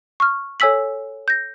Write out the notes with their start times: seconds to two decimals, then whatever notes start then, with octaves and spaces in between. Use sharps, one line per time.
0.20 C#6 F6
0.60 A4 C#5 G#5 E6 B6 F#7
1.28 G6 A#6